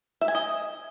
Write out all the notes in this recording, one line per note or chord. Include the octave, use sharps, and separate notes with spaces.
E5
G#5
D#5